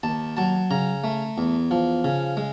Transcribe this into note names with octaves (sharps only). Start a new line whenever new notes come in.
D#2 A5
F#3 A5
C#3 A#5
A3
E2
F3
C#3
G#3